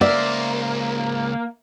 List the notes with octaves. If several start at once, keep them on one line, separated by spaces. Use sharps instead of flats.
C#2 A#3 C5 D5 E5